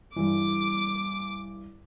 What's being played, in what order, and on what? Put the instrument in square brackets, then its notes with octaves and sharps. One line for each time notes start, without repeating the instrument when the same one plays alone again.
[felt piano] G2 E3 [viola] D6